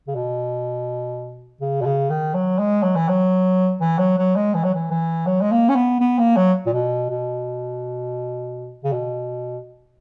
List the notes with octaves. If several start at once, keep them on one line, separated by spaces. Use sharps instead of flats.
C#3
B2
C#3
B2
C#3
D#3
F#3
G#3
F#3
E3
F#3
E3
F#3
F#3
G#3
E3
F#3
E3
E3
F#3
G#3
A#3
C#4
B3
B3
A#3
F#3
A#2
B2
B2
C#3
B2